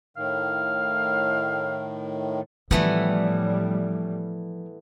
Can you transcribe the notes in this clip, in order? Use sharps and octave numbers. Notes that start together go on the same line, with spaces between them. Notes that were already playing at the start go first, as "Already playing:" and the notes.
A2 D#3 F5
A2 E3 F3 G3 A3 B3